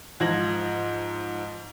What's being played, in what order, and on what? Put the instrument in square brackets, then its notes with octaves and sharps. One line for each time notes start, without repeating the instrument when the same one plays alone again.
[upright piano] G#2 F3 G#6 A#6 F#7